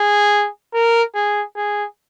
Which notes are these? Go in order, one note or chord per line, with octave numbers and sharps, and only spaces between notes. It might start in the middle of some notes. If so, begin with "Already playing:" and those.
Already playing: G#4
A#4
G#4
G#4